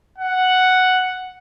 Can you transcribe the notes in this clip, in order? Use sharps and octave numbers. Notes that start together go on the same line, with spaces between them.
F#5